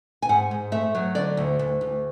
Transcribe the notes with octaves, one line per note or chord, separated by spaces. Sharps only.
G#5
G#2 F#5
G#2
A3 E5
F#3
D3 D5
D2
D2
D2